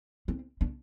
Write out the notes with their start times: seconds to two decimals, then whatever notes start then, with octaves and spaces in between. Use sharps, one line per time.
0.28 C4
0.61 D4